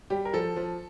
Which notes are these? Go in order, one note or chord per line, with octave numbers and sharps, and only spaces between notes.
G3 G4
A#4
F3 A4
F3